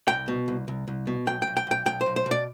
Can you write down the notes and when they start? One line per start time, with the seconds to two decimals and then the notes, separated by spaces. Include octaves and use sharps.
0.08 C2 G5
0.28 B2
0.48 C2
0.68 C2
0.88 C2
1.07 B2
1.27 B1 G5
1.42 G5
1.47 B1
1.57 G5
1.67 B1 G5
1.86 B1 G5
2.01 C5
2.06 B1
2.16 C5
2.26 B2
2.31 D5